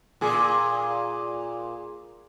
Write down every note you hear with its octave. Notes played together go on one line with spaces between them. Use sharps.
A#2 G#4